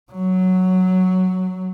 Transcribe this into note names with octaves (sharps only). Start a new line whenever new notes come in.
F#3